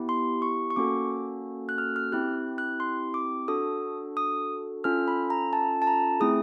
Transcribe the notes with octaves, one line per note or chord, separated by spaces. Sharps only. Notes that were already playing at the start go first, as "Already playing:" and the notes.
Already playing: B3 E4 G4
C6
C#6
C#6
A#3 C#4 F#4 A4 D6
F#6
F6
F6
C4 E4 G4 F#6
F#6
C6
D6
D4 F#4 A4 D#6
D#6
C#4 F4 A4 F6
B5
A#5
A5
A5
A#5
A3 C4 E4 G#4 D#6